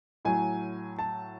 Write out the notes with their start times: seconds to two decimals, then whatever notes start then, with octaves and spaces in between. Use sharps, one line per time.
0.25 A2 F#3 G#5
0.99 A5